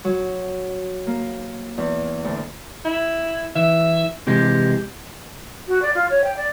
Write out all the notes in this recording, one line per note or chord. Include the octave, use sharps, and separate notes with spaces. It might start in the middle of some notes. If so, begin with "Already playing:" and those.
F#3
A#3
E2
D2
E4
E3 E5
C3 E3 G#3 G4
F#4
D5
F4
C#5
G5
D5